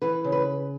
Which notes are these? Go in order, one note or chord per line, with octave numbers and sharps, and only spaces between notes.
E3 B4
C#3
B4